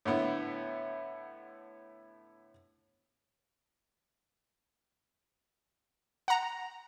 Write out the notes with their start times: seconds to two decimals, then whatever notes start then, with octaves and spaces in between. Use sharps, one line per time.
0.05 A2 D3 B3 E4
6.28 F#5 A#5